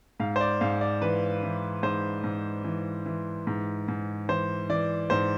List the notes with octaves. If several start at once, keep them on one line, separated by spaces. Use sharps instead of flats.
G#2 F5
C5
D5
G#2 F5
D5
E3 B4
E3
G#2 C5
G#2
E3
E3
G#2
G#2
E3 C5
E3 D5
G#2 C5